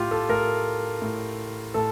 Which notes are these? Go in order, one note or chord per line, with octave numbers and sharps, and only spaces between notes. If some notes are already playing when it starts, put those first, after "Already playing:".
Already playing: A2 F4 G4
A4
A2 A#4
A2
A2 A4